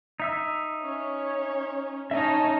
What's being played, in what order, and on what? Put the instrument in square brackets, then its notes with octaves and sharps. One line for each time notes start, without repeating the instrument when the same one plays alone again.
[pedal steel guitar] D#4 E5 E6
[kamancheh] C#4 C#5
[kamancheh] C#4 A5 [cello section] D#4 [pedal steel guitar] C#5 D#5 E5